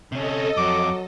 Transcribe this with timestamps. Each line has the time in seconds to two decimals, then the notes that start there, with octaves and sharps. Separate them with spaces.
0.12 C3 C#4 A4 D#5
0.57 F2 F#3 D6